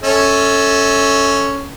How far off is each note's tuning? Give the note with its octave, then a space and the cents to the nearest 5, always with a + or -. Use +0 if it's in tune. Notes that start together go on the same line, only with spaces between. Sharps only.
C#4 +5 A4 +0 E5 -30